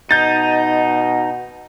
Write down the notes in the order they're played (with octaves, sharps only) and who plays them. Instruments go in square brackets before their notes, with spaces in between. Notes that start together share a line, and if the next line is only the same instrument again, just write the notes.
[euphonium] B2 [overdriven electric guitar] D#4 [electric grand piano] G6 A6